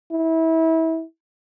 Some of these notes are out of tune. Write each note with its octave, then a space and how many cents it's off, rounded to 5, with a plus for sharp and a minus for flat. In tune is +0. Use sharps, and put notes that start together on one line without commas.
E4 -25